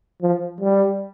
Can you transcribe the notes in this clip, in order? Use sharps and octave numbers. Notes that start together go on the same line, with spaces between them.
F3
G3